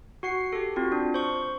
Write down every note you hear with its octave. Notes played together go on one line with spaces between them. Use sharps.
F#4 F#5 C7
G4 A4
C4 F4 F#4
D4
C5 C#6